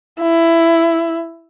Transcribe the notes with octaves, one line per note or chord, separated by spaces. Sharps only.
E4